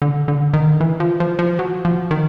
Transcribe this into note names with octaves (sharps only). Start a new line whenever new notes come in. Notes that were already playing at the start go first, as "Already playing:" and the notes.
D3
D3
D#3
E3
F3
F3
F3
F#3
F3
D#3